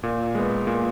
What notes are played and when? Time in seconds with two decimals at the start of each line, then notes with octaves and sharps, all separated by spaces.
0.03 A#2
0.35 G#3 B3
0.67 A#2